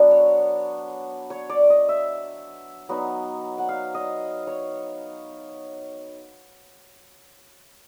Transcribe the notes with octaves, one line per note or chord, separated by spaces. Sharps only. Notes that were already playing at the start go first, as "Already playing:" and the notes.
Already playing: F#3 B3 D4
C#5
C#5
D5
D#5
E5
F#3 B3 D#4
F#5
F5
D#5
C#5